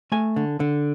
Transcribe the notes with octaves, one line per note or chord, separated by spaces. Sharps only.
A3 G#5
D3
D3